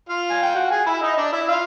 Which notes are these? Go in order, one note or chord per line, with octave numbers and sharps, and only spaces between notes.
F4 F5
G#5
G5
F#4 F#5
G#4 G#5
E4 E5
D#4 D#5
D4 D5
E4 E5
F4 F5